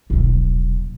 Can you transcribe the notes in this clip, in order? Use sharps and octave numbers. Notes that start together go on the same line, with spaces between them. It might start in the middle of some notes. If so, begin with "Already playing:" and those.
D#1 B1